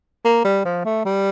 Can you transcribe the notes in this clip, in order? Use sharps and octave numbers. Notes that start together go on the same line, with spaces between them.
A#3
G3
F3
A3
G3